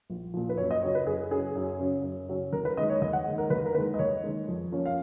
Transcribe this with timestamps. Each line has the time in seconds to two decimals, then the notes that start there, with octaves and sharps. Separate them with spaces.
0.10 A#1
0.34 A#2 F3
0.49 B4
0.57 F#2 C#5
0.71 D#5
0.82 C#3 F#3 C#4 C#5
0.95 B4
1.07 F#2 G#4
1.31 C#3 F#3 C#4 G#4
1.55 F#2
1.80 C#3 F#3 C#4
2.03 F#2
2.28 C#3 F#3 C#4
2.53 D#2 A#4
2.65 B4
2.77 D#3 G#3 D#5
2.90 C#5
3.01 D#2 D#5
3.13 F#5
3.25 D#3 G#3
3.38 A#4
3.50 D#2 B4
3.65 A#4
3.74 D#3 B4
3.77 G#3
3.94 D#5
3.99 D#2 C#5
4.23 D#3 G#3
4.48 F2
4.72 F3 A#3 C#4
4.86 F5